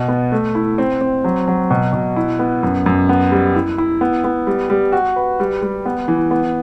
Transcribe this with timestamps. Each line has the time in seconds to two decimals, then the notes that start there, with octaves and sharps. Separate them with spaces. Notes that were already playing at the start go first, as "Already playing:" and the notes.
Already playing: B2
0.08 B3
0.32 A3
0.55 E4
0.78 C4
1.01 C4
1.24 F#3
1.48 F#3
1.70 B2
1.93 B2
2.16 E4
2.39 B3
2.63 F#2
2.86 F#2
3.09 B3
3.32 G3
3.55 E4
3.78 E4
4.01 B3
4.24 B3
4.47 G3
4.70 G3
4.92 F#4
5.16 B4
5.40 G3
5.62 G3
5.86 B3
6.08 E3
6.31 B3